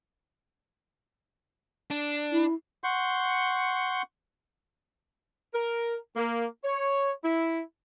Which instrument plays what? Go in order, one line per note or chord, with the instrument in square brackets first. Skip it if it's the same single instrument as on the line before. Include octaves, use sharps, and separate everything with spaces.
[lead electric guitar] D4
[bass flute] E4
[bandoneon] F#5 C6 C#6 G6
[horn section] A#4
A#3
C#5
E4